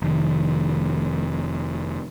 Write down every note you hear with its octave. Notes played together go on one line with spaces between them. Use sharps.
F1 D#3